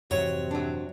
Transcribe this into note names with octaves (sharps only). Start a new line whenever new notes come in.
F2 G#2 C3 E3 F#3 C#5
F#3 D4